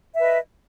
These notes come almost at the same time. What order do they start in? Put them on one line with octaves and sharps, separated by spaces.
E5 B4 D#5